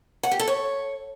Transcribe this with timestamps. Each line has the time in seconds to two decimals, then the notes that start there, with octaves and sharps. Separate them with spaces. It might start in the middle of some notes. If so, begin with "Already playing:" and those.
0.23 F#5
0.31 G4
0.39 A4
0.48 C#5